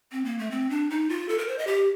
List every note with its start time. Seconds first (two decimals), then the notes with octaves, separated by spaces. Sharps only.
0.12 C4
0.25 A#3
0.38 A3
0.51 C4
0.70 D4
0.90 D#4
1.09 F4
1.29 A4
1.38 A#4
1.48 C5
1.58 D#5
1.67 G4